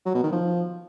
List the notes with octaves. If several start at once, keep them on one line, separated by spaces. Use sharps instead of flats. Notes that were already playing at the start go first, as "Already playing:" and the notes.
F#3
B2
D#3
F3